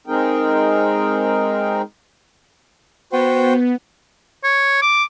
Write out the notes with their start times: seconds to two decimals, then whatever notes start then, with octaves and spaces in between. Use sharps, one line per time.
0.07 G#3 C4 D#4 G#4 A#4 G5
3.13 B3 F#4 C5 G5
4.44 C#5
4.82 D6